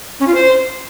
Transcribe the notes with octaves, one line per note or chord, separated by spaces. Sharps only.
C#4
F4
C5